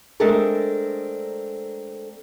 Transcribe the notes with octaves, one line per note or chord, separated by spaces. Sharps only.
G#3 A3 C4 D4 A4 A#4